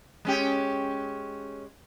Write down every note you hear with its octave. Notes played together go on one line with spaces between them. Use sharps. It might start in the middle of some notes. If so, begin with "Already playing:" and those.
G#3 C#4 G4